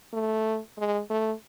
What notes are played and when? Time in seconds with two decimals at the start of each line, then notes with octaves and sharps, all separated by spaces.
0.13 A3
0.78 G#3
1.10 A3